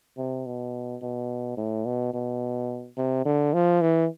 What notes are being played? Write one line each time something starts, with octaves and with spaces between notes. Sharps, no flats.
C3
B2
B2
A2
B2
B2
C3
D3
F3
E3